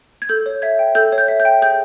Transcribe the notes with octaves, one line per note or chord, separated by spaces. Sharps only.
G#6
A4 G6
C#5
E5 G#6
G5
A4 G6
C#5
G6
E5
G6
G5
G#4 G6